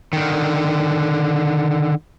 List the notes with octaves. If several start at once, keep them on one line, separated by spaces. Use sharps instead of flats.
D3 D#3